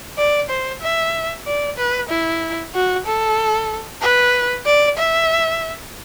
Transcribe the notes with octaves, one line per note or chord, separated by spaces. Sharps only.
D5
C5
E5
D5
B4
E4
F#4
A4
B4
D5
E5